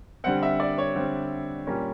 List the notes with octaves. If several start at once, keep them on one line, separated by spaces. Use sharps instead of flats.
D3 G3 C4 F#5
E5
D5
C#5
D3 G3 C4
A#2 G3 A#3 C#4